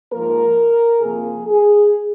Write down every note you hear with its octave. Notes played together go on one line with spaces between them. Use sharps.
G#2 F3 A#3 A#4
C3 F3 A#3 G#4
G#4